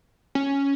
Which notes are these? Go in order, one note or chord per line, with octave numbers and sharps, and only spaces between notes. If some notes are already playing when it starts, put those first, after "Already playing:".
C#4